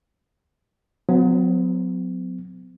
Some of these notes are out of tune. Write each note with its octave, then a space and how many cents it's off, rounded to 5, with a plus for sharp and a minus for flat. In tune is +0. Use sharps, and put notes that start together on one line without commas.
F#3 -25 B3 +45